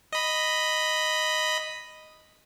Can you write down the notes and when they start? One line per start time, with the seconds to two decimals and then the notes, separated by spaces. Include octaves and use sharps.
0.13 D#5 B5